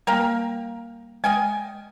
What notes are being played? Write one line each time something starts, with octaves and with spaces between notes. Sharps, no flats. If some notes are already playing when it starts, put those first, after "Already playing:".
G3 A#3 A#4 F5 G5
G#3 D#5 G5 G#5 F6